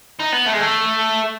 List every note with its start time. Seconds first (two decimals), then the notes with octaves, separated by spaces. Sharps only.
0.20 D#4
0.33 B3
0.46 A3
0.54 G#3
0.61 A3